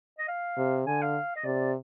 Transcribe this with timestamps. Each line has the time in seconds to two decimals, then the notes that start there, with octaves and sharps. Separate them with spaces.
0.19 D#5
0.28 F5
0.57 C3
0.87 D3 G#5
1.02 F5
1.36 D#5
1.45 C3 D5